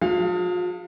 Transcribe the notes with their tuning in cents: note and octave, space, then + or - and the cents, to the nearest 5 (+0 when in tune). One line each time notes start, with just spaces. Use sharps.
F3 +45 G#4 -30 F5 +0